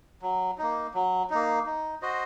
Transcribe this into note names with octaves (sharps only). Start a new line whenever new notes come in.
F#3
A#3 D#4
F#3
A#3 D#4
D#4
F#4 C5 D#5